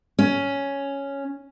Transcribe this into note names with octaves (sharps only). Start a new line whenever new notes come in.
C#4